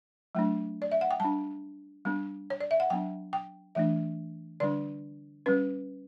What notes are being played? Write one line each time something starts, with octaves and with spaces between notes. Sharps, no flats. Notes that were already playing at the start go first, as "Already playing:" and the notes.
F#3 A3 D4
D5
E5
F#5
G5
G3 D4 A5
G3 B3 D4
C#5
D5
E5
F#5
F#3 B3 D4 G5
G5
E3 A3 D4 E5
D3 G3 D4 D5
G3 C#4 B4